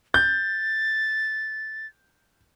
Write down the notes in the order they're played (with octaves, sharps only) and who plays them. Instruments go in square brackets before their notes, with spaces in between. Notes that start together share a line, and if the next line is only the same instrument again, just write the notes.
[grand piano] G6 [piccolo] A6